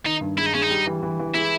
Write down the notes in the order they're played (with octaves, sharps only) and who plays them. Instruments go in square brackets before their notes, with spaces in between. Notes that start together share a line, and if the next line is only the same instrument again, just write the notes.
[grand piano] D#3 [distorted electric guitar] D#4
[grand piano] G2
[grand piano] G#3 [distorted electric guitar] E4
[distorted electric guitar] D#4
[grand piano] G#3 [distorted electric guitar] C#4
[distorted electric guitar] D#4
[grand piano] G3
E3
E3
E3
[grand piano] G#3 [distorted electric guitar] E4